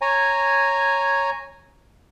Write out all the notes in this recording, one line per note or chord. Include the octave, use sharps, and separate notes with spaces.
C#5 G#5 A#5